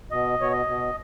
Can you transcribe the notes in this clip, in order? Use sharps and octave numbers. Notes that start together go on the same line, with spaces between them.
B2 D#5
B2 C#5
D#5
B2